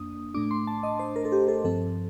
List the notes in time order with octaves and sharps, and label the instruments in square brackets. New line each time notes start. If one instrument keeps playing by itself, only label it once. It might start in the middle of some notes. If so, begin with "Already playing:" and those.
Already playing: [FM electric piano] F2 A#3 D4 D#6
A2 A3 D4 D6
C6
A5
D#5
C5
A#4
A4
G4
A4
G2 F3 C4 A4